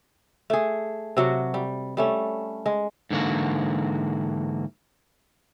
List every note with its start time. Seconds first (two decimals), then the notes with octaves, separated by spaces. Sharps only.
0.50 A3 G#4
1.17 C3 F#3 F#4
1.54 G3
1.97 G3 A3 C#4
2.66 G#3
3.11 G#2 D3 E3 A#3 F#4